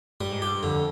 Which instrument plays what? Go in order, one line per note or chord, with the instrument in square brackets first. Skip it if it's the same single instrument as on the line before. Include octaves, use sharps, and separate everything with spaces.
[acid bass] G2 [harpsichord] G3
[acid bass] G#2
[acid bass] G2 [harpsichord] G4
[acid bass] F2 [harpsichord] D3